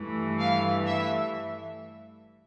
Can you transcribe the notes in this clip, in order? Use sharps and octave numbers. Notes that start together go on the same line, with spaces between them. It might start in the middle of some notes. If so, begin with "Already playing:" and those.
Already playing: G2 E3 A3
F5
E5